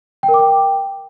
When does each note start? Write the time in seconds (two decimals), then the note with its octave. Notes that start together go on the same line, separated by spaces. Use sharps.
0.23 G5
0.28 A#4
0.34 D6
0.39 G5